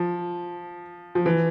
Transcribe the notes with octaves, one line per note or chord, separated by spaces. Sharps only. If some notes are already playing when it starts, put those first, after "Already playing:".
Already playing: F3
F3
E3